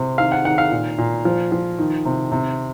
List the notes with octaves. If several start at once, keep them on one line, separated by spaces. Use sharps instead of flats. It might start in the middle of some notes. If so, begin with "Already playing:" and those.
Already playing: C3
D#3 F5
F#5
D#3 F#5
F5
A#2
A#2
F3
F3
D#3
C3
C3